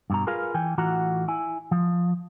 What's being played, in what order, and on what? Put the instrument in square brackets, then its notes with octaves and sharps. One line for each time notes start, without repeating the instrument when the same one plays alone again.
[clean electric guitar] G2 B2 A#5
F4 G#4 A#4 B4 F5
E3 G5 G#5
A2 E3 F4 F#4 F#5 A#5
E4 G#5
F3